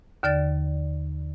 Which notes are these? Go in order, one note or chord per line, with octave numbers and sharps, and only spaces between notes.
D#2 D3 D5 A6